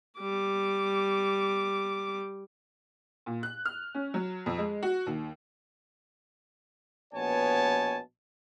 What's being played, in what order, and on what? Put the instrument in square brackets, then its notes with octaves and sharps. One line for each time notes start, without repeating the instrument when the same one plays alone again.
[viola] G3 D6
[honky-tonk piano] A#2
F#6
F6
C#4
F#3
F2
G#3
F#4
D#2
[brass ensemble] A#1 B2 B3 C#5 G#5 A5